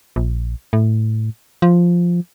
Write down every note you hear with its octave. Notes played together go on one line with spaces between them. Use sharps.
A#1
A2
F3